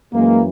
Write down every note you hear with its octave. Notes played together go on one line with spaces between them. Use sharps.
F#2 E3 G#3 A#3